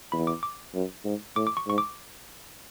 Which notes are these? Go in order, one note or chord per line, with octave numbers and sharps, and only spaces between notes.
E2 B5
D6
D6
F#2
G#2
A2 D6
D6
C#6
G#2 C#6
D6